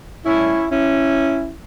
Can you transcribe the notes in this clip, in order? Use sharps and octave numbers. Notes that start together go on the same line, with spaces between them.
A2 G3 C#4 E4
C#4 E4